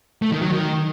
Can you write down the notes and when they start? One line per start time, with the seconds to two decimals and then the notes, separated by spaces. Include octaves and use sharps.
0.22 A3
0.32 D#3
0.41 F#3
0.51 D#3